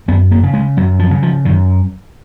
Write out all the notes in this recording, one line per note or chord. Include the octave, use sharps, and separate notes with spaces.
F#2 B3
A#3
C#3
G#3
F#2 F#3
F3
C#3
F3
F#2 D#3